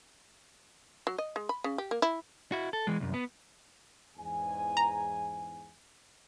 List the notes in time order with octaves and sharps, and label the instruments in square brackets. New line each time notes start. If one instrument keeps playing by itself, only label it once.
[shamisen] F#3
D#5
G#3
B5
C#3
G4
A#3
E4
[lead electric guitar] E4 F#4
A4
E3 G#3
C2 F#2
B3
[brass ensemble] E2 G#2 G#5
[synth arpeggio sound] A#5